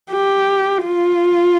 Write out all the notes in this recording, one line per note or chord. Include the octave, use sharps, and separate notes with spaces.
G4
F4